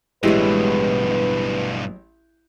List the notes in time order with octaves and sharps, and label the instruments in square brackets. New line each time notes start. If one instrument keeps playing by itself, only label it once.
[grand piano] A1 E4 G4 [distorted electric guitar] G2 B2 [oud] F#3 G#3 [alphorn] B4